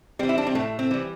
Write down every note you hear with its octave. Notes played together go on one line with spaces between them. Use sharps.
E3 G3 C4
E4
D4
C4
A2 A3
C4
E3 G3